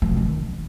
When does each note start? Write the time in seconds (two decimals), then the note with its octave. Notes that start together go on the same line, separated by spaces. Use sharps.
0.02 F3
0.09 B2
0.17 D#3